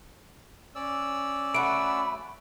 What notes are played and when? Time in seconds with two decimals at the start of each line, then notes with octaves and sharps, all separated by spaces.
0.75 C#4 D5 E6
1.54 A3 F#4 B5 D7